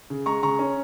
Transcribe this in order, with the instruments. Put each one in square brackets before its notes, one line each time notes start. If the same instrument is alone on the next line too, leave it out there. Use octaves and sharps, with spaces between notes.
[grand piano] C#3
G#3 A#5 C#6
C#3 A#5 C#6
C#4